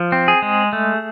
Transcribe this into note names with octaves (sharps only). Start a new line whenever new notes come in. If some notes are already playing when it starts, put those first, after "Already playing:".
Already playing: F3
C4
G#4
G#3
A3